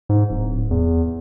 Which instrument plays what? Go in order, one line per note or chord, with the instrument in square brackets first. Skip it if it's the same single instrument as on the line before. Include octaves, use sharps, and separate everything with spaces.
[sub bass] G#2
D1
E2